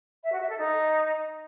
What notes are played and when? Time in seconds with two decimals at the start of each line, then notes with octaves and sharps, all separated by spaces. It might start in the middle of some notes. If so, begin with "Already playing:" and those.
0.23 E5
0.32 F#4
0.41 E5
0.49 A4
0.58 D#4